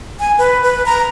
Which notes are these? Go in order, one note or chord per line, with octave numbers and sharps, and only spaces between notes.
G#5
B4
B4
A#5